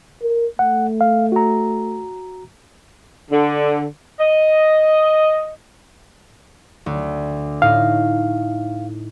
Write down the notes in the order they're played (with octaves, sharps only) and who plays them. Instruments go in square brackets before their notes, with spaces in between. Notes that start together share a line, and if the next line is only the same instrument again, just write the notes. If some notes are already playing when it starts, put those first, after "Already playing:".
[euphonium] A#4
[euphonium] A3 [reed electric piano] F#5
[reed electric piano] F5
F#4 A#5
[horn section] D3
D#5
[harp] D2
[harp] A2 D#4 [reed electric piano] F5